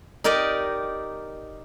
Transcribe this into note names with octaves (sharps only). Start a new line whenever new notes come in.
D#4 G4 A#4 D5 D#5